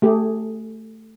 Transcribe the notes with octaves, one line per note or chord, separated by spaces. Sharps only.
A3 G4 G#4